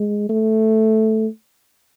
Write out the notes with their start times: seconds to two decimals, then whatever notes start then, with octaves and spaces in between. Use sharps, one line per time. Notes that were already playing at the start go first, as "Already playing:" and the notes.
Already playing: G#3
0.30 A3